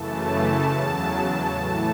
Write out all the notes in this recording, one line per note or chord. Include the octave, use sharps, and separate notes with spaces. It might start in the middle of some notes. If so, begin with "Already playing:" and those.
Already playing: F#2 C#3 E3 A3 A5
E2 C#3 F#3
A2 E3 A3